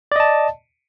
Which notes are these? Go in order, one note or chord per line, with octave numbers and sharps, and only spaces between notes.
D5 D#5 A5